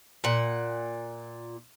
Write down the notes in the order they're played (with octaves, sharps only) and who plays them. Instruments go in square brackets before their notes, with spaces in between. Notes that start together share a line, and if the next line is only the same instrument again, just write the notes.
[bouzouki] A#2 F#5